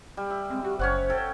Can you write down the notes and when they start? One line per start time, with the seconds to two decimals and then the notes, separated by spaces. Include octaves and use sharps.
0.17 G3
0.30 E5
0.50 G#3 C4
0.64 F#4 G4
0.79 F#1 C#4 C5 C#5 F#5
1.10 A4 G5